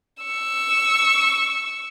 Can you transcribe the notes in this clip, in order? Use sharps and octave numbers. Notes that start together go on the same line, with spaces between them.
C#6 E6